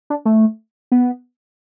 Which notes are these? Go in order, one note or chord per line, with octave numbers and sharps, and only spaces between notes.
D4
A3
B3